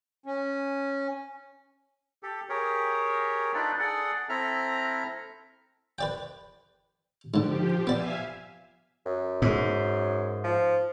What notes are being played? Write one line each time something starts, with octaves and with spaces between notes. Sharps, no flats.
C#4
G4 A4
G4 G#4 A#4 C#5
D4 D#4 F4 A4 B4 D5
G#4 A4 D5 F#5
C4 E4 A4 E5 A#5 F6
B4 D5 G5
G#2 D3 F3 G4
B3 D5 E5 F5 G#5
F#2
G#2
F3